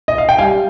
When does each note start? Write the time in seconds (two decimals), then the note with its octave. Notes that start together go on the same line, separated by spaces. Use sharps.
0.08 D#5
0.18 F5
0.29 G5
0.38 G3 F5 G#5